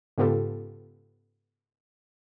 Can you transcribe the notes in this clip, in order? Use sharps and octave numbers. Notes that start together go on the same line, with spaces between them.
G#2 C#3 B3 F4 G4 A4